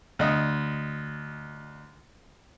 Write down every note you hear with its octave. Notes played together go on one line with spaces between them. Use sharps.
D2 D#5